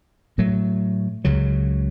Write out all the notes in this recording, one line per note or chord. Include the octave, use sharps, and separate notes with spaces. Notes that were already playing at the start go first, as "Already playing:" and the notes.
A2 F#3 A3
C#2 C#3 F#3